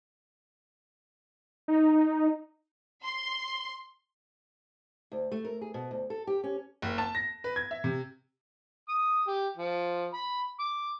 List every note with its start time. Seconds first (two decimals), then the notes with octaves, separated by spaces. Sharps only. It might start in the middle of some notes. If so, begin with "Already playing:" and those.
1.68 D#4
3.04 C6
5.12 D2
5.32 A3
5.45 A#4
5.61 G#4
5.74 B2
5.91 D2
6.10 A4
6.27 G4
6.44 C#4
6.82 F#1
6.98 A5
7.15 A#6
7.44 B4
7.56 G#6
7.71 E5
7.84 C3
8.89 D#6
9.28 G4
9.57 F3
10.14 B5
10.59 D6